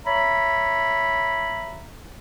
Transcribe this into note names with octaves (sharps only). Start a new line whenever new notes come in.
C#5 E5 A#5 B5